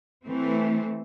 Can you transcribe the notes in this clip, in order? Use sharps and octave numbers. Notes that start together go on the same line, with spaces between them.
E3 A3 C4